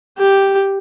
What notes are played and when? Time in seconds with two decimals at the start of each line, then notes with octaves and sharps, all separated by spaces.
0.18 G4